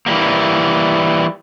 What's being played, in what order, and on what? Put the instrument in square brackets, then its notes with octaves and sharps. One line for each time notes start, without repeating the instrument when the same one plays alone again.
[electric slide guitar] E3 G3 A#3